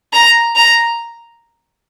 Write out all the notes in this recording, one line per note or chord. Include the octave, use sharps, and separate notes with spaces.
A#5
A#5